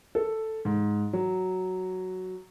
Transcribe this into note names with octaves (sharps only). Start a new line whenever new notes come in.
A4
G#2
F#3